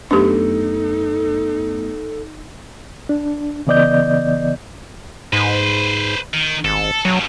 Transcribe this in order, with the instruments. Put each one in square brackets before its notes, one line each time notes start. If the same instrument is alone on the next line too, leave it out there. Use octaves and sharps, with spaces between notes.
[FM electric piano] F#2 A3 B3 [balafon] D4 G4 [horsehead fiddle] D#4 [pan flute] A4
[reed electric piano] D4
C#3 E3 B3 D5 D#5 G6
[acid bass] G#2 [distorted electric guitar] B4 C5
[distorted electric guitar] D#3
[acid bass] G#1 [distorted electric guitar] A4
[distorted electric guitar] G2 B2 [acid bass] F#3